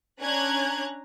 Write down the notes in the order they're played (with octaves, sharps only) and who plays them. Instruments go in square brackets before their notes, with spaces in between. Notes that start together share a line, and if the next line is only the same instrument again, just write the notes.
[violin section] C#4 D4 A#5 F#6 G#6